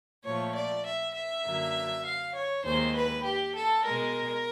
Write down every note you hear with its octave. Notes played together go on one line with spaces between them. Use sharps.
A#2 F3 A3 C#5
D5
E5
E5
F#2 D3 F#3 A#3
F5
C#5
D#2 D#3 G#3 C5
B4
G4
A4
B2 G#3 A#4